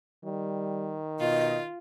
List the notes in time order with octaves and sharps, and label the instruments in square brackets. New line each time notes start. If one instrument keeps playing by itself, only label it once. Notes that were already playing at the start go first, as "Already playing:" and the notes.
[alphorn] D#3 [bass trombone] G3
[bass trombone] B2 [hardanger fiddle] F4 [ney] D#5